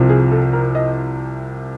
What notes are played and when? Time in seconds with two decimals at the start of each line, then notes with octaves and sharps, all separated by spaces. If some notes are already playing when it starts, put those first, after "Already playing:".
Already playing: C2 C3 F3
0.09 G#4
0.31 A4
0.53 A#4
0.75 D#5